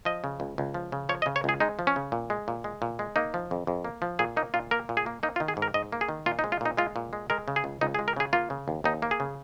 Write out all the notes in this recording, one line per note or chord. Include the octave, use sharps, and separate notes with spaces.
F3 D#5
C#3
C#2
C#2
F3
C#3
F3 C#5
D#5
C#3
C#5
C#2 G#4
G#3 D#4
F3
C#4
C#3
A#2
G#3
A#2
G#3
A#2
G#3
A#3 D#4
F3
F2
F2
A#3
F3
A#2 G#4
A#3 D#4
A#2 F4
A#3 A#4
A#2
G#4
A#3
A#3 D#4
F4
D#3
G#4
G#2
A#4
G#2 D#5
A#3
G#4
D#3
A#2 F4
D#4
G#3
F4
A#2 D#4
G#3 F4
A#2
G#3
G#3 A#4
C#3
G#4
C#2
C#2 D#4
G#4
G#3
A#4
C#3 G#4
A#3 F4
C#3
D#2
D#2 D#4
A#3
G#4
C#3